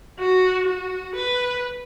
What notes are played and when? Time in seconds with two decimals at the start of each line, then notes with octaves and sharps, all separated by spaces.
0.20 F#4
0.67 F#4
1.16 B4